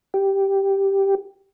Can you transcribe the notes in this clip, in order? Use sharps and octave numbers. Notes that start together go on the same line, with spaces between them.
G4